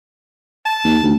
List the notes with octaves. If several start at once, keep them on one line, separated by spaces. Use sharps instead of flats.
A5
D#2
D2